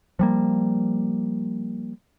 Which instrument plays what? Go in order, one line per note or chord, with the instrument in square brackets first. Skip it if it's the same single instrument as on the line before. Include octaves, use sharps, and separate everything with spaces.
[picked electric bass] F3 G3 A#3